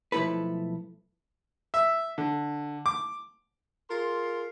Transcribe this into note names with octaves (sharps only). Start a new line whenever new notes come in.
B1 F3 A3 E4 A4 B4
E5
D3
D6
F4 G#4 A#4 C6